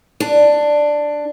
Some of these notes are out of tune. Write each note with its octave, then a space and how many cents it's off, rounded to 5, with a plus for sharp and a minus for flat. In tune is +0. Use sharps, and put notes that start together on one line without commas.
D4 +5